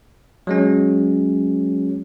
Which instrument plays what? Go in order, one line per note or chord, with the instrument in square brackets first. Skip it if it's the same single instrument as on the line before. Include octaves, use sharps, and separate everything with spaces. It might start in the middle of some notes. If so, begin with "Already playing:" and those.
[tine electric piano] F#3 G#3 C#4